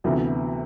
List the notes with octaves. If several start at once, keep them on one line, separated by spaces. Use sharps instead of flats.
D2 C3 E3 B3 F#4